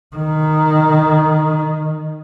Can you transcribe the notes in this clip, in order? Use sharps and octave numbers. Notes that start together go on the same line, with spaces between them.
D#3